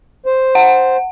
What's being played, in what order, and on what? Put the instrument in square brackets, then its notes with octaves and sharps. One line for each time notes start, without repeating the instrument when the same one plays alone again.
[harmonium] C5
[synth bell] F#5